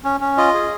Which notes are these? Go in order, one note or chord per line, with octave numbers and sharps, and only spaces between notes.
C#4
C#4
F4 D#5
G#4